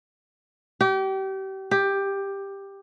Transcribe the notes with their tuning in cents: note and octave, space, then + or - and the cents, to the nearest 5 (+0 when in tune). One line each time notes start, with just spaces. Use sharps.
G4 -30
G4 +10